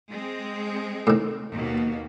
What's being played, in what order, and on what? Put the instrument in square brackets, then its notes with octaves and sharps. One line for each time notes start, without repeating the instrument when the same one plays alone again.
[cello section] G#3 C4
[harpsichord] A2 D#3
[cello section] D#2 B2 A#3